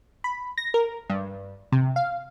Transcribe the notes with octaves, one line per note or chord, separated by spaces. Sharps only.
B5
A#6
A#4
G2
C3
F5